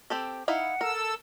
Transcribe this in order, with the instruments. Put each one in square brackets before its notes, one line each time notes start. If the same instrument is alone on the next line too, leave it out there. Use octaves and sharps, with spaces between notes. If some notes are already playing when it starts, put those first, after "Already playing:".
[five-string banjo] C4 G4 A4
[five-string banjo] D#4 E4 F5 [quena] F#5
[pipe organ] A4 E6 [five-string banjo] A#4